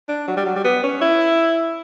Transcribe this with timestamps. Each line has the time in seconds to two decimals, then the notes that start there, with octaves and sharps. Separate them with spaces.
0.08 D4
0.28 F#3
0.36 G3
0.46 F#3
0.56 G3
0.64 B3
0.83 C#4
1.01 E4